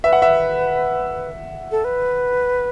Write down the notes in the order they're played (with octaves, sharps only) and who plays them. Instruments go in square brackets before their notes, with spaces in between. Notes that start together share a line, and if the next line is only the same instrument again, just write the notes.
[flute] B4 [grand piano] E5
[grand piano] F#5
E5
[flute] A4
B4